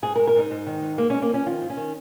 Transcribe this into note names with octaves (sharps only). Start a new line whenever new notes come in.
G#2 G#4
A#4
G#3
A#4
G#2 D#4
G#2
D#3
G#2
G#3 A#3
G#3 C#4
A#3
F3 C#4
D#3 F4
G#2
C#4
D#3